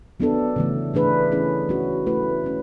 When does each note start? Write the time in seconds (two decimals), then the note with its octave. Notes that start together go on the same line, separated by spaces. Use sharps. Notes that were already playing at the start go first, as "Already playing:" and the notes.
0.20 F#3 B3 D4 A4
0.56 C#3 E3 A3
0.94 E3 A3 D4 G#4 B4
1.32 A3 C#4 E4 G#4
1.69 F#3 C#4 F#4
2.07 A3 E4 B4
2.44 A3 C#4